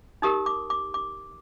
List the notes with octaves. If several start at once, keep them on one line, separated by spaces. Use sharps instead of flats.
D#4 G4 A#4 D#6
D6
D6
D6